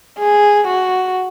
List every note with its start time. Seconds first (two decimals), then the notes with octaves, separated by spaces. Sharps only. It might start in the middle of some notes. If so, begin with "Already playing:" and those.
0.18 G#4
0.67 F#4